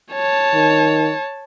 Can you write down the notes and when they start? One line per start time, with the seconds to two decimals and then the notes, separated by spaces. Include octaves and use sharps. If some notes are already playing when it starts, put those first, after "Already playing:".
0.13 C#5 A5
0.54 D#3